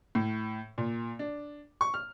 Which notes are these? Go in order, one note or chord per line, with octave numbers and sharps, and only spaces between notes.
A2
A#2
D4
C#6
F6